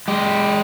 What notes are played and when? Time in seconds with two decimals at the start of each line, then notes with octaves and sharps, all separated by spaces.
0.08 G#3 G4